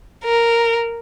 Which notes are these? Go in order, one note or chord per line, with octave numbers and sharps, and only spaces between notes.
A#4